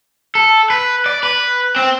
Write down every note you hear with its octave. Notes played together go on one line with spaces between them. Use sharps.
A4
B4
D5
B4
C4